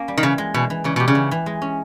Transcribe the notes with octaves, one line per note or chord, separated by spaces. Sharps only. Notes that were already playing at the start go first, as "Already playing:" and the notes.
Already playing: A#3 C#4
G3
D#3
C#3 E3
G#3
B2 E3
E3
C#3 E3
B2 G4
C#3
E3
E3
G#3
C#4